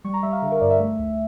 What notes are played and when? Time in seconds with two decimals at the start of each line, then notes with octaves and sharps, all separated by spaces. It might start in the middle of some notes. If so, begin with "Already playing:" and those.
0.04 G3 C#6
0.14 A#5
0.23 G3 E5
0.32 F5
0.42 D3
0.52 A#4
0.61 G2 D5
0.70 E5
0.80 A3
0.99 D2